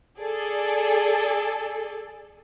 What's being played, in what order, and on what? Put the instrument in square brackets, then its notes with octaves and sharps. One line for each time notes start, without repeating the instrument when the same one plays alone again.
[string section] G#4 A4 D5